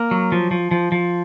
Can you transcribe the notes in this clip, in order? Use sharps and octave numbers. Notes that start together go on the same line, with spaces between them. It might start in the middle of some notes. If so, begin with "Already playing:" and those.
Already playing: A#3
F#3
F3
F3
F3
F3